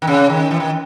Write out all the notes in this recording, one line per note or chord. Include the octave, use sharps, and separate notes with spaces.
D#3
C#3
D#3
E3
D#3